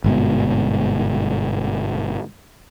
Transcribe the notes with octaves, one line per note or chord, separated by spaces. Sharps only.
G1 G#2 B2